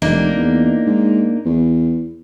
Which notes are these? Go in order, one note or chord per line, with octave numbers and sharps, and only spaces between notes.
F1 A#3 D4 D#4
E2
G#2
E2